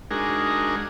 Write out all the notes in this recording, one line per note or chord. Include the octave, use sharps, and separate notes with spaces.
G#3 D4 D#4 F#4 G#4 A#4